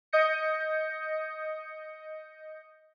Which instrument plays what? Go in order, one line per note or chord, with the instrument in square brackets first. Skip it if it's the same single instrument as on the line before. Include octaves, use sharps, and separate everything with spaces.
[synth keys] D#5 D#6 G6 A#6 C#7